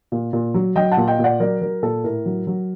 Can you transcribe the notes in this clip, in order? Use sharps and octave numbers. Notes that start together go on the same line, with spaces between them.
A#2
A#2
F#3
F#3 D#5 G5
F#5 A5
A#2
D#5 G5
A#2
D5 F#5
F#3 A#4 D5
F#3 A#4
A#2 A4
A2 A#4
F#3
F#3